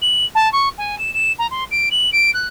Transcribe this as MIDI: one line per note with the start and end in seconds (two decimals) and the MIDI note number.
0.02 0.25 102
0.35 0.51 81
0.53 0.69 85
0.78 0.98 80
0.99 1.13 100
1.14 1.32 100
1.39 1.47 82
1.51 1.64 84
1.71 1.89 98
1.91 2.10 102
2.12 2.31 98
2.34 2.48 90